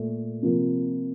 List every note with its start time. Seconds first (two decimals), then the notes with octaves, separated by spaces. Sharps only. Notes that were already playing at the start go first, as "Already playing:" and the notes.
Already playing: A#2 A3
0.42 C3 F3 A#3